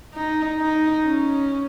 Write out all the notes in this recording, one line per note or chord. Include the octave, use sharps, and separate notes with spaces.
D#4
D#4
C#4